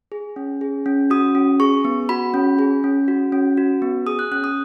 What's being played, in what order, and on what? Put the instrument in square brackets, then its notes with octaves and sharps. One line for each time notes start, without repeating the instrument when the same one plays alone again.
[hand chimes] G#4
C#4
G#4
C#4
F#4 D#6
C#4
G#4 C#6
B3
F#4 B5
C#4
G#4
C#4
F#4
C#4
F#4
B3
G#4 D#6
F#6
C#4 F#6
D#6